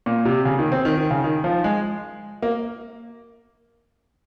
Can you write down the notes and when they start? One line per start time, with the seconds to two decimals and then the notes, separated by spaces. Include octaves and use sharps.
0.06 A#2
0.25 C3
0.45 C#3
0.59 D#3
0.72 C4
0.85 D#3
0.97 D#3
1.11 C#3
1.24 D#3
1.44 F3
1.64 G#3
2.42 A#3